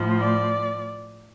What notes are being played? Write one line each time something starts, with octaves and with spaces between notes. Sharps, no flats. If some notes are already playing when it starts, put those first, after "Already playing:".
Already playing: A2 F3
D5